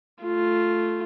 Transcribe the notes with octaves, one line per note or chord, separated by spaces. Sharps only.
A3 F4